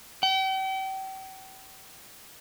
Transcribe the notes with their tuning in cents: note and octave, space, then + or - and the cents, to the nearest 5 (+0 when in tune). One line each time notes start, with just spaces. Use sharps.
G5 -40